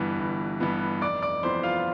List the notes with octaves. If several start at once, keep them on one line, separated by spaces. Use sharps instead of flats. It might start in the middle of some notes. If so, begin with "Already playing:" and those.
Already playing: G1 G2 E3 B3
G1
G2 E3 B3
F1 D5 D6
D5 D6
F2 E3 B3 C5 C6
F4 F5